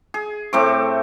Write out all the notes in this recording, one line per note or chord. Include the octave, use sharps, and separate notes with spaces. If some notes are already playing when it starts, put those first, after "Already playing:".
G#4
A2 A3 C4 D6